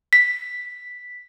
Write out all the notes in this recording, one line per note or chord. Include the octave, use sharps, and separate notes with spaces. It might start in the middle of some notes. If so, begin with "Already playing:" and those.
B6